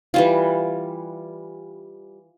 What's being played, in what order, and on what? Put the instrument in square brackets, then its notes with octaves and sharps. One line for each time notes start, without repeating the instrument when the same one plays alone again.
[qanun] E3 G3 F4